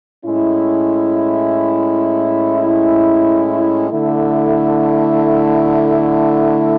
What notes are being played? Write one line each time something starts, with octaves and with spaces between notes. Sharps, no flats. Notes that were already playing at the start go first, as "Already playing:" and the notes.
A2 G#3 C#4 E4
D3 A3 E4